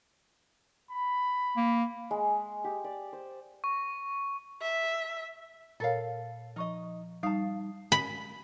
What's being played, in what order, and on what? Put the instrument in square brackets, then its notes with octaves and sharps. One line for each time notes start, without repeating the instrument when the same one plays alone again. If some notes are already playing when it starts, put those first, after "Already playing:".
[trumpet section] B5
[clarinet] A#3
[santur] G#3
G4
D5
C5
[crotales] C#6
[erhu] E5
[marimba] A#2 A#4 C#5 [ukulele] A4 F5
[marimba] F3 C#6 [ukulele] D#4 D#5
[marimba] G3 D#4 D#6 [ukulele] F5 A5
[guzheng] B5